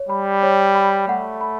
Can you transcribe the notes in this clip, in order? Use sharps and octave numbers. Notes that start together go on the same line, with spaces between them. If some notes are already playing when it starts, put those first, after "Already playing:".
Already playing: C#5
G3 B5
C#5
B5
A3 F#5
B5